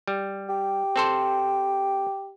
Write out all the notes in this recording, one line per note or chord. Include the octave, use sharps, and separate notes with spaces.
G3
G4
C4 A4 C5